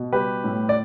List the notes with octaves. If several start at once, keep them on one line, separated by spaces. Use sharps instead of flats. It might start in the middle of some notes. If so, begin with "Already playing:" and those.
Already playing: B2
G3 G4 B4
A2
D5